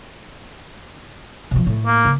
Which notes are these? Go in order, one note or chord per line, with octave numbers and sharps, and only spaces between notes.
B2 F3
A2
A#3
C#3